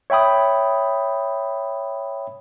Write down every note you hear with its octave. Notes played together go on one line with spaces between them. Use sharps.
C#5 E5 G5 B5 D#6